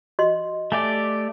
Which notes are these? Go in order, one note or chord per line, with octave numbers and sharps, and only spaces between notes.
F#4 D#5 C6
A3 G4 D5 G#5